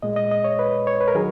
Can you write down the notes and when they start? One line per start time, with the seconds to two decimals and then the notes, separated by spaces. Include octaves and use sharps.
0.02 A#2 G#3 D#5
0.16 D#5
0.32 D#5
0.44 C#5
0.59 B4
0.87 C#5
1.01 B4
1.08 A#4
1.15 D#3 F#3 G#4